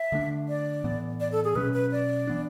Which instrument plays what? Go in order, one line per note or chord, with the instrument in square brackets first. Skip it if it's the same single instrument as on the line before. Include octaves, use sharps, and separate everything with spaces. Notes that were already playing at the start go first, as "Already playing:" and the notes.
Already playing: [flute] E5
[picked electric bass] D3 A3 D4
[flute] D5
[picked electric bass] A2 E3 B3
[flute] D5
A4
G#4
[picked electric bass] B2 F#3 C#4 [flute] B4
[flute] B4
D5
[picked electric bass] E3 B3 D4